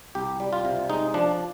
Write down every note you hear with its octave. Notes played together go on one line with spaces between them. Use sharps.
C2 G4
G3
F4
C3
G#3 D#4
F3 D4